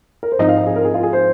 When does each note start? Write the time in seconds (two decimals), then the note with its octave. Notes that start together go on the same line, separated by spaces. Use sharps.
0.23 A#4
0.32 C5
0.39 G#2 F3 C4 D#4 D#5
0.49 F5
0.57 D#5
0.67 G#4
0.76 A#4
0.85 G#4
0.94 F4
1.03 G#4
1.13 C5